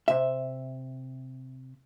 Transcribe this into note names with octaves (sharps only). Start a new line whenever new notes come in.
C3 E5